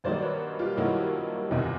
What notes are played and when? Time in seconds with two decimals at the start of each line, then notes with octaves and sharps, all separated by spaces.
0.04 G2 D#3 F#3 A#3 D#4 C5 D5
0.22 B4 C#5
0.59 F4 G4
0.77 G2 D#3 F#3 A#3 D#4 E4 F#4
1.51 F#1 E2 C3 D#3